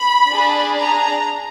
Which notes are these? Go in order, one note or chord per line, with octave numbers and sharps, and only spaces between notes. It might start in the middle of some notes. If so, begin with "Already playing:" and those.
Already playing: B5
D4 G#4
A#5